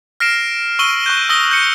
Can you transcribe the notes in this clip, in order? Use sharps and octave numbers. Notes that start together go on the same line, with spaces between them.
F6 A#6 C7 D7 E7
C#6 E6 D#7 G7
C#6 F#6 G6
D#6 E6 A#6 G7
G6 C#7